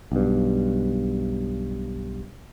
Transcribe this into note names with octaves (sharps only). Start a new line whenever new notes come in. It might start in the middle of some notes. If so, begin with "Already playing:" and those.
B1 G2